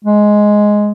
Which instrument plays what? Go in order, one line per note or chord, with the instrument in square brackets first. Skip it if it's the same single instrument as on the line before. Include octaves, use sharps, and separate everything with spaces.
[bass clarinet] G#3